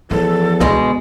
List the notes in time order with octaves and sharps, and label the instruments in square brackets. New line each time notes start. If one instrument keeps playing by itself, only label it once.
[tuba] E2 [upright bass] F3 [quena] A4
[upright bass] D2 [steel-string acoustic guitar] B2 G#3